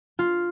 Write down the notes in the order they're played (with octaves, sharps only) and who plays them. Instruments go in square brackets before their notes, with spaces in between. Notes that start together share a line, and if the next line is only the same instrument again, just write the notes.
[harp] F4